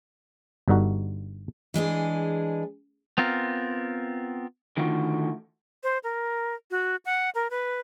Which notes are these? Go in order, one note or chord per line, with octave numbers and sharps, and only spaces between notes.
G1 G2 D3 D#4 F#4
E3 G#3 D4 G#4
B3 C4 F4 A#4
D3 D#3 A3 F4 F#4
C5
A#4
F#4
F#5
A#4
B4